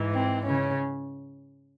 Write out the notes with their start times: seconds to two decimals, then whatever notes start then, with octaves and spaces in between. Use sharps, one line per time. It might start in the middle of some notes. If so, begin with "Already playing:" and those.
Already playing: G#2 E3
0.14 C4
0.45 C#3 C#4